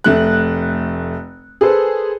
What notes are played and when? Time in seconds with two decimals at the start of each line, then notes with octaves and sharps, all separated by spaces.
0.04 F1 A3 F#6
1.61 G#4 A4 B4 C5